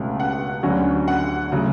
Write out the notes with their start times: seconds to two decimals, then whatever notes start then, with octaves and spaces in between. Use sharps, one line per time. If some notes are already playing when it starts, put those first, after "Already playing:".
Already playing: C#2 B2 A3 C#4
0.20 F#5
0.63 D2 D3 F#3 C#4
1.08 F#5
1.52 C#3 F#3 A3